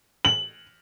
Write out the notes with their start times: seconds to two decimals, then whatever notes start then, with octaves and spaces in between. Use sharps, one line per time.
0.25 F#7